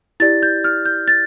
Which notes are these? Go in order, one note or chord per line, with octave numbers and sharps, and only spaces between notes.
E4 G4 D5 A6
G6
F6
G6
A6